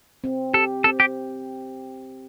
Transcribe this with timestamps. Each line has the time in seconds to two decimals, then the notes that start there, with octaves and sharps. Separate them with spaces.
0.24 C4
0.54 G4 A4
0.84 C4 A4
1.00 G4